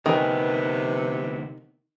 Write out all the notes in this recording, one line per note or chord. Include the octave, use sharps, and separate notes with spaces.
D2 C3 D#3 B3 B4 G#5